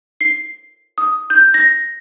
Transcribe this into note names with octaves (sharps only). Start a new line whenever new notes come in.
C7
D#6
G6
A#6